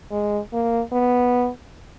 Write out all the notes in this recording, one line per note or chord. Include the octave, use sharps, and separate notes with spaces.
G#3
A#3
B3